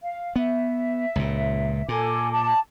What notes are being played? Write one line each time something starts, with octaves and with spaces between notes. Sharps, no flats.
F5
B3 E5
C#2 A#2
A#2 A4 G#5 D6
A5 D6